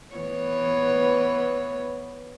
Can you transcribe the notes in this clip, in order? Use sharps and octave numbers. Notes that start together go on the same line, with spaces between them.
E3 B3 C#5